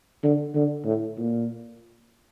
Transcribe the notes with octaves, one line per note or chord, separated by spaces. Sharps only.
D3
D3
A2
A#2